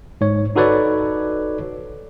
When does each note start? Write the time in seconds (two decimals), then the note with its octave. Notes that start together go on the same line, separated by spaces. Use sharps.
0.21 G#2 C#5
0.56 D#4 F#4 A4 B4 C#5 D5